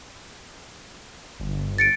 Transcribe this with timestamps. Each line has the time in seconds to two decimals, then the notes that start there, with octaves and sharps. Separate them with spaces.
1.40 G1
1.78 A6 C#7 D7